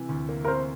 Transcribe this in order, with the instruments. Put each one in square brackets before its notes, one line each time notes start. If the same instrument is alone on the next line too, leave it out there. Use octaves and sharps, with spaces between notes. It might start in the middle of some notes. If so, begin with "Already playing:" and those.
Already playing: [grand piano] C3 E3
D2
A#3
[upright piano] A#4
[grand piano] C3 [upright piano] C5